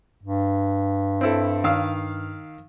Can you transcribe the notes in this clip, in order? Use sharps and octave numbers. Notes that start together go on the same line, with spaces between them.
G2
C4 E4 A4
D#3 F5 E6